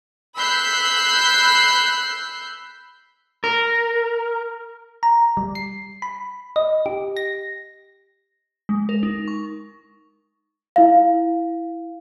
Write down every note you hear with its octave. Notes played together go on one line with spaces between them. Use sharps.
B5 E6 F#6 G6 B6 C7
A#4
A#5
G3
C7
B5
D#5
G4
A#6
G#3
A#4
D#4
C#6
E4 F5